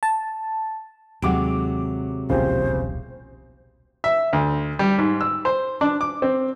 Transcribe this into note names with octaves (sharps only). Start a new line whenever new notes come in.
A5
D#2 C3 F#3 G#3 F#5 D6 D7
D#1 B1 A#2 C#3 F3 G4 C5
E5
D2
G3
G#2
E6
C5
D4
D6
C4